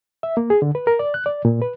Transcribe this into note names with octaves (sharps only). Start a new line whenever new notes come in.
E5
A#3
G#4
D3
B4
A#4
D5
F#6
D5
A#2
B4